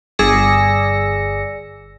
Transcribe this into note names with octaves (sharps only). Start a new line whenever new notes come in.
G1 G#4 D5 E6 A#6 C#7